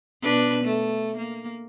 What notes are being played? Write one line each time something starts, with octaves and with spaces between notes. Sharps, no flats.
B2 D4 B4
A3
A#3